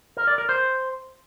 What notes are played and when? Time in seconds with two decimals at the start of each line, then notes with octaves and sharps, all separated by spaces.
0.17 A#4
0.27 D5
0.38 A#4
0.49 C5